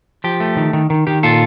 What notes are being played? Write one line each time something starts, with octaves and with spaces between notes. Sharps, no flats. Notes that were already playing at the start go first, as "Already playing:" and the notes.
F3 G4
A3
D#3
D#3
D#3
D#3 G4
A#2 F4 A4